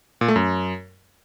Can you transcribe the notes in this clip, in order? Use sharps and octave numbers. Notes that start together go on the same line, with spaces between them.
A#2
A3
F#2